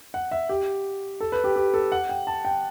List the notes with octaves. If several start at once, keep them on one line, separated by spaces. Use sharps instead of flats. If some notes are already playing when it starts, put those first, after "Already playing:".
F#5
E5
G4
A4
B4
G4
G4
A4
F#5
G5
A5
G5